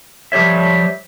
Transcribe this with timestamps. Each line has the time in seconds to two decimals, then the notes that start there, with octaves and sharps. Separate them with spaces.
0.32 F3 G3 G4 C#5 E5